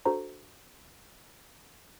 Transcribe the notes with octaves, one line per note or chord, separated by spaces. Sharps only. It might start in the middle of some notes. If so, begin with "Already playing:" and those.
D4 F#4 A4 C5 A#5